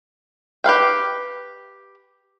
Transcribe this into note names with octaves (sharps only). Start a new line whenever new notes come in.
G4 B4 F5 G5